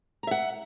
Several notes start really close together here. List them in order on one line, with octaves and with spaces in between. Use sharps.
A#5 E5 F#5